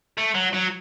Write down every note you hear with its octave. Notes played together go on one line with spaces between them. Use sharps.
A3
F#3
F#3